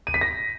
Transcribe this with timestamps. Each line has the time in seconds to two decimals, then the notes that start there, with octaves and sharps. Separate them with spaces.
0.07 D#7
0.14 B6
0.21 A#6